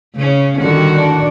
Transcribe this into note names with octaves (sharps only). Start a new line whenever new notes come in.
C#3 C#4
D3 D#3 G3 F#4
D4